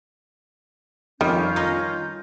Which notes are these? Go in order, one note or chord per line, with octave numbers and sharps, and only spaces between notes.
F2 D#3 G3 C#4 F4 G6
D#4 D#5 A#5 A#6